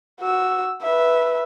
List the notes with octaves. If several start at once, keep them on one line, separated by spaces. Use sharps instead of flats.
F#4 E6
B4 E5